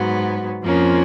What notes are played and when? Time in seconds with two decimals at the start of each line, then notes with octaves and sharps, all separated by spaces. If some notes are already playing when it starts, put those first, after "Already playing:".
Already playing: G#2 F#3 B3
0.63 F2 F3 A#3 C#4